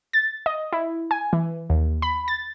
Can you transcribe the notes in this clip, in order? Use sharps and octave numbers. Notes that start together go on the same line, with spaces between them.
A6
D#5
E4
G#5
E3
D#2
B5
A6